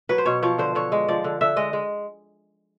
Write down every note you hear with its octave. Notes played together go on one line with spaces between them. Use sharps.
F#3 B4
C5
B2 C#5
F3 C#5
D3 C5
D3 C#5
G#3
F3 D5
D3
D3 E5
G#3 D#5
G#3